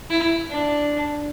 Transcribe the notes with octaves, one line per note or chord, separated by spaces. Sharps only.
E4
D4